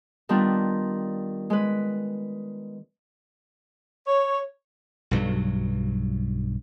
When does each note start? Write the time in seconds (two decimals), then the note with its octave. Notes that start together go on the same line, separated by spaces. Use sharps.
0.29 D#3 G3 B3 D4 F4
1.50 G#3 B4
4.07 C#5
5.11 B1 G2 F#3